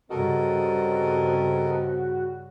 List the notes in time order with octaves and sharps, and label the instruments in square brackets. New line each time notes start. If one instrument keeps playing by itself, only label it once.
[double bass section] G2 C#3 [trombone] C4 [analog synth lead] F#4 [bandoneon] A4 A#4 D#5